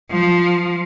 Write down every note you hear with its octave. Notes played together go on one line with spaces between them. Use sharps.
F3